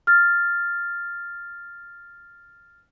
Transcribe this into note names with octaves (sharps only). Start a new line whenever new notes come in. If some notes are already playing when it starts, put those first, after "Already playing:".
F6 A6